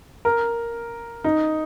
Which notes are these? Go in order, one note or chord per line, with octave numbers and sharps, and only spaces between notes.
A#4
D#4